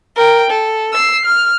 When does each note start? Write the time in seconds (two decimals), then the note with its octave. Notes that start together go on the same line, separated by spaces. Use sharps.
0.16 A#4 G5
0.50 A4
0.93 E6 C7
1.25 F6